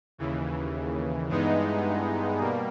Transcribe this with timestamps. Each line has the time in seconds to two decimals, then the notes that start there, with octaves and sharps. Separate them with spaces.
0.18 D#2 C#3 E3
1.29 G2 E3 G#3 B3 D#4
2.40 B2 G3 A#3